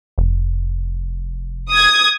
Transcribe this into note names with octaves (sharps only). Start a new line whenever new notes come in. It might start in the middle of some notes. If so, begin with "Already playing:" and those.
F1
D#6 G#6